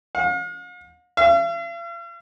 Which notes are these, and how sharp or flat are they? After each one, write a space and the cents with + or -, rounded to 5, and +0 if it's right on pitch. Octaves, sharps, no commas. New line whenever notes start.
F5 +45
F5 -45